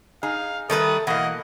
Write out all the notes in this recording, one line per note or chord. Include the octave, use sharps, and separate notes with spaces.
D#4 G#4 F5
D#3 G3 A3 A4 B4 D#6
B2 E3 A#3 D#5 F#5